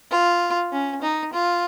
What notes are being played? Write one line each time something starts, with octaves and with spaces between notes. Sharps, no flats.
F4
C#4
D#4
F4